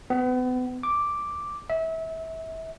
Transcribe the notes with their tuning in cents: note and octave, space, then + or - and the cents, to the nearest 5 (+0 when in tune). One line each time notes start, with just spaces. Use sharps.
B3 +35
D6 +0
E5 -30